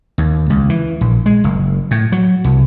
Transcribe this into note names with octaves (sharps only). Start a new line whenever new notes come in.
D#2
C#2
E3
A#1
G#3
F#1
A2
F#3
C2